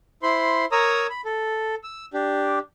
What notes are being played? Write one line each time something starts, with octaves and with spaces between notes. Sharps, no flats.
E4 C5 B5 C6
A#4 C#5 A#5 D#6 E6
B5
A4
E6
D4 G4